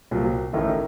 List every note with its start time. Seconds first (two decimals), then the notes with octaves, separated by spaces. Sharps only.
0.11 C2 A#2 F#3 A#3
0.53 A1 A2 A3 D#4 A#4